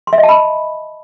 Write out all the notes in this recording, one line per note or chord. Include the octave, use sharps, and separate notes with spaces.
C6
E5
D#5
A5
B5